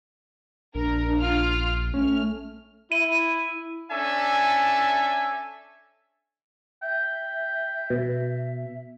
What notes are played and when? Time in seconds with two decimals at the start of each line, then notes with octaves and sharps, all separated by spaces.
0.75 A#1 D4 A#4
1.18 F4 F6 D7
1.94 A3 C#4 F6
2.92 E4 D#7
3.91 C#4 D4 A4 E5 G#5
6.82 E5 G5
7.90 B2